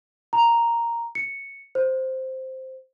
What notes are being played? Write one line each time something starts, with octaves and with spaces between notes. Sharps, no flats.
A#5
C#7
C5